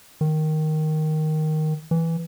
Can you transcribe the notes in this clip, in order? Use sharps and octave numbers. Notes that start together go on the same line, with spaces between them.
D#3
E3